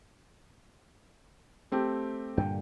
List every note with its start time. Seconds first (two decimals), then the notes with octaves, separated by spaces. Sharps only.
1.72 A3 C4 G4
2.38 G2 A#2 D3 G5